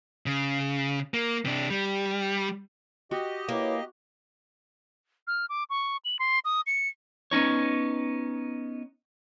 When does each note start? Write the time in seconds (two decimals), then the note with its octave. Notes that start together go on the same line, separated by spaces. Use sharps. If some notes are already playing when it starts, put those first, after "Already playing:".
0.26 C#3
1.14 A#3
1.45 C3 D4
1.70 G3
3.11 F#4 G4 D#5
3.49 A#3 E4 B4 C#5
5.27 F6
5.49 D6
5.70 C#6
6.05 F#7
6.19 C6
6.45 D#6
6.66 C#7
7.31 B3 C#4 D#4 C#5